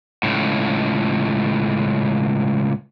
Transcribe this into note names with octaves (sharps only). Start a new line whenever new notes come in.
C#2 A2